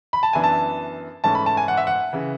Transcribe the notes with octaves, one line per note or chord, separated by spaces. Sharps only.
B5
A5
F#2 E3 B3 D4 G#5
A5
G#2 E3 A3 C#4 A5
B5
A5
G#5
F#5
E5
F#5
C#3 E3